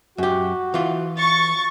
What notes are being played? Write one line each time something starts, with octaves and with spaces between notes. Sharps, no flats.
F#2 F#4 G4
E3 F4
C#6 A6